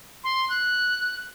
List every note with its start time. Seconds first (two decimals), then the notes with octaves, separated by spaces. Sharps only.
0.24 C6
0.50 F#6